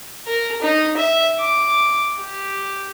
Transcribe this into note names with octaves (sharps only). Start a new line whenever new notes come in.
A#4
D#4
E5
D6
G4